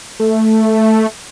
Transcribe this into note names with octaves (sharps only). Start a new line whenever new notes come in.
A3